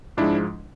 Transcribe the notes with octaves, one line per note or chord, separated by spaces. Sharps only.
G#2 F3 G#3 D4 E4